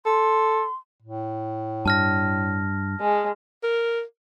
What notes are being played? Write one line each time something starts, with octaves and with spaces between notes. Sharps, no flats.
A4 C6
A2
G2 A5 F6 A#6
G#3
A#4